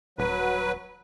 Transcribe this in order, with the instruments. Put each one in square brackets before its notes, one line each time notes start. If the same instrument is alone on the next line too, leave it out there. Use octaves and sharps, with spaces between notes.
[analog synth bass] D#1 [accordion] F#3 B4